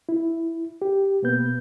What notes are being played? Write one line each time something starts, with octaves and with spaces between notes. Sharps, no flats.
E4
G4
B2 A#3 B3 B4 G6